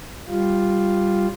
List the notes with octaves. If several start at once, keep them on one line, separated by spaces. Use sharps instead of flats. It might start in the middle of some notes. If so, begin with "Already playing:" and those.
G3 F4